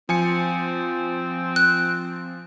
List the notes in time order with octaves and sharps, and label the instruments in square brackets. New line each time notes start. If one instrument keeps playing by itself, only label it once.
[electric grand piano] F3 G#5 C#7 [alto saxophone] C4
[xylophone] F#6